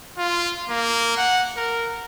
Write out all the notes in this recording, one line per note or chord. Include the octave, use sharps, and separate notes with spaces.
F4
A#3
F#5
A#4